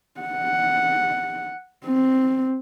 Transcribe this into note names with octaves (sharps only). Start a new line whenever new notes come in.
F#5
C4